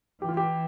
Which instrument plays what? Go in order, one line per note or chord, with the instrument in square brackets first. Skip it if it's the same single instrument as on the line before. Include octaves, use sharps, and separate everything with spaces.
[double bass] E3 [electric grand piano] G4
[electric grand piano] F4
G4